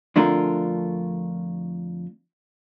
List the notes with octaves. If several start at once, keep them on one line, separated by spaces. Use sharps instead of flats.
F2 D3 A3 D4 F4 A#4